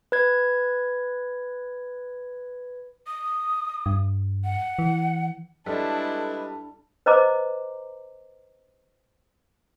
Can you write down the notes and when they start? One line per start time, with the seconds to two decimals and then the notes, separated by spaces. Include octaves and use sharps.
0.12 B4 G#6
3.07 D#6
3.86 G2
4.44 F#5
4.79 E3
5.66 G3 G#3 D4 E4 A4 B4
7.06 B4 C5 D#5 A#5 D6